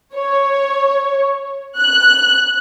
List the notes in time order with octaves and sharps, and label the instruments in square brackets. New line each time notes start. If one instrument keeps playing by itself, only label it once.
[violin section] C#5
F#6